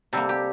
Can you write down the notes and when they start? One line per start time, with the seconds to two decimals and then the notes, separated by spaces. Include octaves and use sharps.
0.13 C3 G3 A#3 A4
0.29 G4